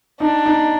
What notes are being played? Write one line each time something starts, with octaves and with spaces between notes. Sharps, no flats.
D4 D#4
D#4